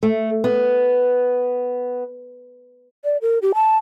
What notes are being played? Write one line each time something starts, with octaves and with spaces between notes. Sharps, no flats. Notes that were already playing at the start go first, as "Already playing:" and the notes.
A3
B3
D5
A#4
G4
A5